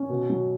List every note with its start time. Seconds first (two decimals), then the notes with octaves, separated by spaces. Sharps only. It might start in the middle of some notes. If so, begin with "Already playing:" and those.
Already playing: C#4
0.09 B2
0.30 F#3